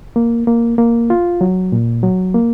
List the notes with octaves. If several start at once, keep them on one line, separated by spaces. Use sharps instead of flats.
A#3
A#3
A#3
F4
F#3
A#2
F#3
A#3